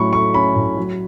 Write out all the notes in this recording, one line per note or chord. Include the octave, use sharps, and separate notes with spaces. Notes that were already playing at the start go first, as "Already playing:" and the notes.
Already playing: A2 F#3 C#4 B5 C#6
A3 C#6
C#4 B5
A2
F#3